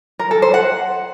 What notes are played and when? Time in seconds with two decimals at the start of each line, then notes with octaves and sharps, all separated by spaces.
0.19 A#4
0.31 A4
0.42 C5
0.54 F#5